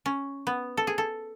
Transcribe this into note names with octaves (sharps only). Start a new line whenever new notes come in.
C#4
B3
A4
G#4
A4